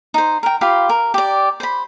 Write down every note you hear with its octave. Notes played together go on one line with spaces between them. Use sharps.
D#4 C5
A#4 G5
F4 G4 F5 B5
A#4
G4 D5
C5 B5